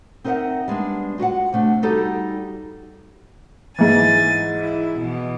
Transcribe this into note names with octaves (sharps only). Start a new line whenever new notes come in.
C4 D#4 A#4 C5 E5 F#5
G3 G#3 B3 D4
F4 F#4 F5 F#5
C3 A3 D4
G3 D#4 F#4 G4 A4
G#2 E3 G#5 A6
E4
B2 E3